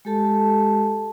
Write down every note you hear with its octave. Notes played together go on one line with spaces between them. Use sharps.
G#3 G4 A4 A5